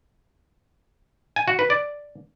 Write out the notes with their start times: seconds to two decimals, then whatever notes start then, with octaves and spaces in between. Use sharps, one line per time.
1.36 G#5
1.48 F#4
1.59 B4
1.70 D5